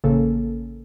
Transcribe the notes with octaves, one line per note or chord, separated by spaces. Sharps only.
A1 C#3 A#3 A4